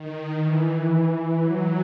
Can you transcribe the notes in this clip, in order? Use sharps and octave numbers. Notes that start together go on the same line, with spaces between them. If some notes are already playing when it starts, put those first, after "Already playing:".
Already playing: D#3
E3
E3
F#3